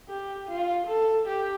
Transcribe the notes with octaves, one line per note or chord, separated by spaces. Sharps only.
G4
F4
A4
G4